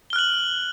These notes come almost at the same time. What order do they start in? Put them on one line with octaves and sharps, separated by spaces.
G7 F6 F#6 F#7